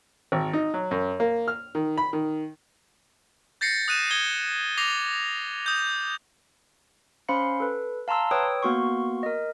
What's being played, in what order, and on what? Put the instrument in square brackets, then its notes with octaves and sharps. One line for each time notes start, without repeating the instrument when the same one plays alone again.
[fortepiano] G#1
D#4
F#3
F#2
A#3
F6
D#3
B5
D#3
[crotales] G6 A6 A#6 C7 C#7
D#6 F#6 D#7 E7
D#6 G#6 C7 G7
D6 A6 A#6 C7 F7
D#6 G6
[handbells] C#4 C5 F5 B5 C6 C#7
A4 B4
F5 A5 A#5 C6 E6
B4 C#5 G5 D#6 E6
A#3 B3 F#4 C6 C#6
A#4 D#5